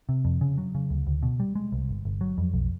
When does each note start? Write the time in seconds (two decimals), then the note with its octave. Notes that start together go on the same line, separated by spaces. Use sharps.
0.09 C3
0.25 F2
0.41 C#3
0.58 F#3
0.75 C#3
0.90 D2
1.07 D2
1.23 B2
1.40 G3
1.55 G#3
1.72 C2
1.89 G1
2.05 G1
2.21 F#3
2.38 F2
2.54 B1